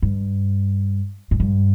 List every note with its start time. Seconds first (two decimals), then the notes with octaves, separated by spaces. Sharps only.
0.02 G2
1.31 G#2
1.40 G2